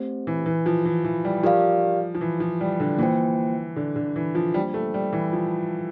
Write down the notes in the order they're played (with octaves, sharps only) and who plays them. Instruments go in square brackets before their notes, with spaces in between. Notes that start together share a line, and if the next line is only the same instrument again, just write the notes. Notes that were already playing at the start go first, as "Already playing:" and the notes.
Already playing: [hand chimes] A3 C4 G4 C5
[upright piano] E3
E3
F3
E3
E3
G3
[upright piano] F3 [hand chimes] G4 A#4 D5 F5
[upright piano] F3
E3
F3
G3
D3
[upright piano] E3 [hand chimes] A#3 F4 C5 G5
[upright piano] D3
D3
E3
F3
[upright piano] G3 [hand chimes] A#3 D4 F4 C5
[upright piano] A3
G3
E3
F3